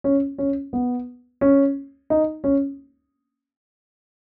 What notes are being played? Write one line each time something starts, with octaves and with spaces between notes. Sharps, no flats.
C#4
C#4
B3
C#4
D#4
C#4